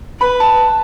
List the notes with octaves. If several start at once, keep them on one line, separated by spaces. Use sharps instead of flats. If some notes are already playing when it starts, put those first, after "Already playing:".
B4 B5
A5